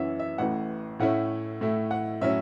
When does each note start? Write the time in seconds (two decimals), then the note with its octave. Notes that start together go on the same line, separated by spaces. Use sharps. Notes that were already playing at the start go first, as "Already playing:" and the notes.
Already playing: F#2 E3 C#4 E4 E5 F#5
0.19 E5
0.38 A1 A2 E3 F#5
0.99 A2 A3 C#4 E4 F#5
1.61 A2 A3 E4
1.91 F#5
2.21 A2 F#3 C#4 E4 E5